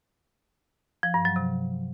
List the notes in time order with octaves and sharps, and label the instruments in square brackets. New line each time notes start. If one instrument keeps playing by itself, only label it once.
[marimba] F3
G2
F#3
C3